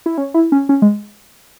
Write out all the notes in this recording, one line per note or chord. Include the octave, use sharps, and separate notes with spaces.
E4
C#4
E4
C#4
C#4
G#3